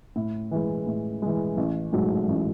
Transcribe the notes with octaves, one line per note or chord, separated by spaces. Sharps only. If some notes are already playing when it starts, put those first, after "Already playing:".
A2
E3 G#3
A2
E3 G#3
A1
G#2 F#3 A3
A1